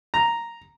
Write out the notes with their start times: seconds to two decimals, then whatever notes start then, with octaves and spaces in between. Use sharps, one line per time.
0.14 A#5